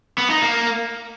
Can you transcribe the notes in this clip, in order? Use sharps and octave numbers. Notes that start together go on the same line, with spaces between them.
B3
D#4
A#3